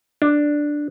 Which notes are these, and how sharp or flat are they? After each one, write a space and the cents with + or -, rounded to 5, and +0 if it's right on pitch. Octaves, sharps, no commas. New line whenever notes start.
D4 +0